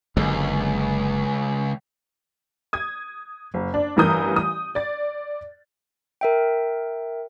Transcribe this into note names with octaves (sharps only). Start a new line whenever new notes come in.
F#1 C#2 D3 G#3
D#6 G#6
F#1
D4
A1 G2 E3 A#4 D#6 G6
D#6
D5 A6
A#4 E5 G5